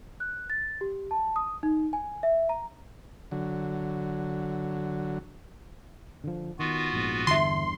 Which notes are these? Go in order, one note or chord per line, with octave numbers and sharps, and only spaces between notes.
F#6
A6
G4
A5
D#6
D#4
G#5
E5
A#5
D3 F#3
D3 F3
D#3 B3 F4 F#4
A#1 G#2
E2 G2 D3 E5 C6